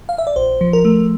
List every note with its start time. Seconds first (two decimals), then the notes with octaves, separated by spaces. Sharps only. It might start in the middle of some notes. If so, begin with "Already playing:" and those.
0.09 F5
0.18 E5
0.27 D5
0.36 A#1 C5
0.61 F3
0.73 A#4
0.85 A3